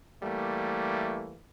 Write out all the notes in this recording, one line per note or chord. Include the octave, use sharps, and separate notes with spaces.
E3 G3 A3 A#3